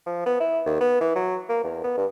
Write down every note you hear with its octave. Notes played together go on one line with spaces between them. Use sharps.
F3
B3
E4
D#2
B3
E3
F#3
A#3
E2
B3
G2